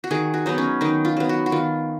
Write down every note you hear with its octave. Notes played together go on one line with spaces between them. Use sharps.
F#4
D#3 G#4
F#4
F#3 B3 D#4
C#4
D#3 D#4
F4
F#3 B3
F#4
F#4
D#3 F4